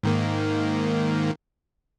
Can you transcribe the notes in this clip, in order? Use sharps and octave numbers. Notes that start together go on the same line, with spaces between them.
G#2 D#3 A#3